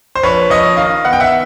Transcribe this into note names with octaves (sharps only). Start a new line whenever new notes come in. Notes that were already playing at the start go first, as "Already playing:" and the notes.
C5
A#1 B4 C#5
A#1 C#5 D#5
D#3 D#5 F5
B3 F#5
G5
E5 F#5